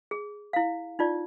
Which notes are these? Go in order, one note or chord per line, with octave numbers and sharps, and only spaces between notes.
G#4
E4 F5
D#4 F4 D5